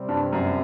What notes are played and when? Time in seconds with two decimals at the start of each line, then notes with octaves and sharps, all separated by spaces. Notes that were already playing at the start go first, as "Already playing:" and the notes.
Already playing: C3 G3 C4
0.09 G2
0.32 F#2